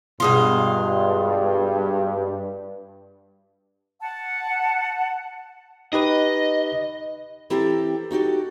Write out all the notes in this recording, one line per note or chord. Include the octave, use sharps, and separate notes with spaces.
G2 B2 G#3 F4
F#5 A5
D#4 G4 B4 D#5
E3 C4 E4 G4 A4 A#5
D#4 F#4 G4 A4